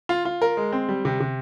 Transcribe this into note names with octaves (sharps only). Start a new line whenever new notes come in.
F4
F4
A#4
G#3
C4
G3
C3
C3